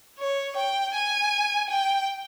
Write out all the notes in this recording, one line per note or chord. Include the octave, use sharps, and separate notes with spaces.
C#5
G5
G#5
G5